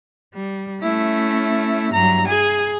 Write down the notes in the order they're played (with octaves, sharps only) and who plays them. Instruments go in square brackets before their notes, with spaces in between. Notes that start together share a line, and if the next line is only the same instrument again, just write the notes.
[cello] G3
[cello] A3 C#4 [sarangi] E4
[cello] G2 F#3 [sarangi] A#5
[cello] G#4 [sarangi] G#5